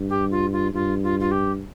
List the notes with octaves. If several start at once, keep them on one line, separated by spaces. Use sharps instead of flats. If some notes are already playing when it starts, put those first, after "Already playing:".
Already playing: G2
G4
F4
F4
G2 F4
F4
F4
G4